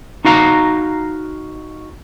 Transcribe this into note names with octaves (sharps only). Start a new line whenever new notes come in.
D#4 F#4 F5 A#5